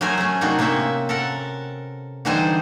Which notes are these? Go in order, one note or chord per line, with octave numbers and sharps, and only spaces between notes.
F#3 A3 G#4 A#4 C5 G#5
A3 C#4
C3 A3 A#3 D4 D#4 F#4
C3 A#3 C4 C#4 E5
A4 A#4 F#5
D3 E3 G3 D#4 G#4 C5